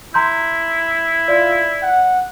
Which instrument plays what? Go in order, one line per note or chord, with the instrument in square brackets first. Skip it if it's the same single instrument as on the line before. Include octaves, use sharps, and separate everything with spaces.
[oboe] E4 [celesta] A#5 C6 G6
[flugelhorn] F4 [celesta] D5
[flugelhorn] F#5